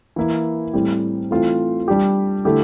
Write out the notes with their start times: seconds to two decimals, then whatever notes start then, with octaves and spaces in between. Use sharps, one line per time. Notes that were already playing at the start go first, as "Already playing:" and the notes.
0.16 E3 A#3 E4
0.73 A2 G3 C4 G4
1.31 E3 A3 C4 F4
1.88 G3 D4 G4
2.45 D3 A3 E4 G4